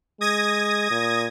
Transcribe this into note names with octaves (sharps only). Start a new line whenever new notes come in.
G#3 D#6 G#6 A#6
A#2